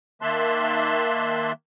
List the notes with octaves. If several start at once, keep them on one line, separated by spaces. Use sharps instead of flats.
D#3 A#3 E5 A5 C6 F#6